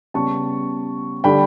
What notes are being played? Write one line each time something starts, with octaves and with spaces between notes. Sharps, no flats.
C#3 G3 B3 A5 C#6
D3 G3 D4 G5 B5